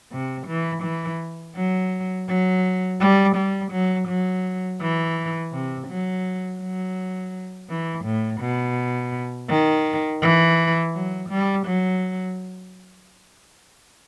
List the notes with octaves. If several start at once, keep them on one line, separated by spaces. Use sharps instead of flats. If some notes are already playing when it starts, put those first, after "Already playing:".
C3
E3
E3
F#3
F#3
G3
G3
F#3
F#3
E3
C3
F#3
F#3
E3
A2
B2
D#3
E3
F#3
G3
F#3